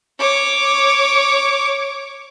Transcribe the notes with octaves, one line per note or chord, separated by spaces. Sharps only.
C#5 D6